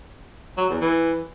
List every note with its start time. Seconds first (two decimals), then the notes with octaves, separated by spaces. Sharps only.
0.57 F#3
0.69 E2
0.81 E3